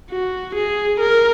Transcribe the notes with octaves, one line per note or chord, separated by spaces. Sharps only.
F#4
G#4
A#4